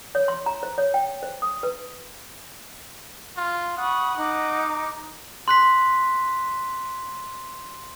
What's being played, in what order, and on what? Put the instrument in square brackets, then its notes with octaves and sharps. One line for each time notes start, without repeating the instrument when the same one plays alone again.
[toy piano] C#5
C6
A#5
C5
C#5
G5
C5
D#6
B4
[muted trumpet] F4
[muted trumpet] F#5 [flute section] B5 C#6 D#6
[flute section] D#4 D6 F#6
[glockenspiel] C6 F#6 B6